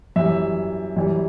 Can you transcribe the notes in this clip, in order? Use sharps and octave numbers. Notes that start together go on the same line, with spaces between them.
F#2 E3 G3 E5
F#2 E3 G3